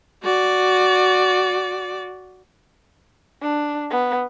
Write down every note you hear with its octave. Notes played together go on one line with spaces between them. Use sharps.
F#4 D5
D4
B3